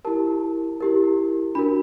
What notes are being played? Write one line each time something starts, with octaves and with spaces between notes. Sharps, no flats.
E4 G4 A#4 A5
E4 G4 A#4
D4 F#4 A#4 B5